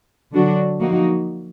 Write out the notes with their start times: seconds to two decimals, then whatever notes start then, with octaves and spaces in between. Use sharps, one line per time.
0.33 D3 F#3 D4 F#4
0.80 F3 A#3 D#4 F#4